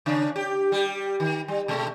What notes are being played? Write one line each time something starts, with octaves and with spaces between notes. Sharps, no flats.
C#3 C#4 D4
G4
G3 G4
D#3
G3
B2 G#3 A3